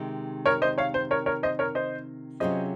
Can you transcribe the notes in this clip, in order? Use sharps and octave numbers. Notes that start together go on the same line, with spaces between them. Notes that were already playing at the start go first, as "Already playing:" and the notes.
Already playing: C3 D#3 G#3
A#4 C#5
C5 D#5
C#5 F5
C5
A#4 C#5
A#4 C#5
C5 D#5
A#4 C#5
C5 D#5
C3 F#3 C#4 F4 G#4 C5 D#5